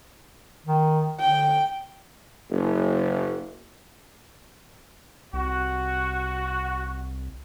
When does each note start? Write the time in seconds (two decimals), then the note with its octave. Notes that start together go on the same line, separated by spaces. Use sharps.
0.66 D#3
1.20 D3 G5
2.51 F#1
5.33 C2 F#4